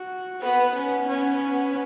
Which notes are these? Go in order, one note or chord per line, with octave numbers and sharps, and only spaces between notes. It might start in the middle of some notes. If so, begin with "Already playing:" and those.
Already playing: F#4
B3 B4
B3 C#4
B3 C#4